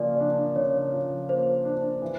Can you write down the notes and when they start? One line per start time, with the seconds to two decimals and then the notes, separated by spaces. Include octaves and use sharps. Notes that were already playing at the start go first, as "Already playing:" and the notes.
Already playing: C#3 F3 A#3 D5
0.20 D4
0.55 C#3 C#5
0.93 F3
1.29 A#3 C5
1.65 D4
2.02 E3